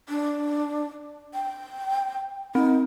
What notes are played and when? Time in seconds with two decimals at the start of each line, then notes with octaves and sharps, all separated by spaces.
0.09 D4
1.34 G5
2.55 C4 D#4